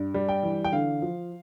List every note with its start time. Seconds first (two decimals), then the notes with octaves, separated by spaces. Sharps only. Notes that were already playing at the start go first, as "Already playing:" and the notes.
Already playing: G2
0.14 G3
0.29 G5
0.43 E3
0.64 G5
0.72 D3 F5
1.02 F3